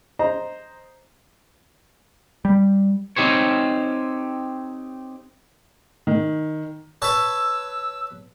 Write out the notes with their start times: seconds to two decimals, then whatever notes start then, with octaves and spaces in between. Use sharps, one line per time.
0.19 C5 D#5 A#5
2.45 G3
3.16 C4 D#4 G4 C5 C#5
6.07 D#3
7.02 B4 C#5 A5 E6